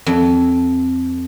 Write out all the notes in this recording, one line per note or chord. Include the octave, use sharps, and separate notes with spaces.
F2